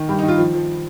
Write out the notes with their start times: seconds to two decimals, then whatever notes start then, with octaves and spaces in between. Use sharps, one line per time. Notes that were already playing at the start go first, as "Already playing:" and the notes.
Already playing: D#3
0.09 G2 G4
0.19 D#4
0.23 D#3 F4
0.38 F3
0.54 F3